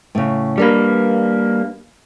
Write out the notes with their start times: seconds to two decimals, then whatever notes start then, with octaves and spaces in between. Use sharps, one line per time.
0.15 A2 C#3
0.58 G3 A#3 D4 A#4 B4